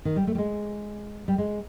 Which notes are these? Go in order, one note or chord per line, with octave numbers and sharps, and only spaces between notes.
D#3
G3
A3
G3
G#3
G3
G#3